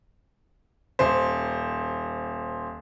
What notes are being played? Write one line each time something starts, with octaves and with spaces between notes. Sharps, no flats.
D#1 C5